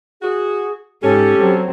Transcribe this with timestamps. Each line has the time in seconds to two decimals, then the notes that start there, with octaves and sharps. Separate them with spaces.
0.22 F#4 G#4
1.03 G#2 C#4 G4 A4
1.38 F#3 C4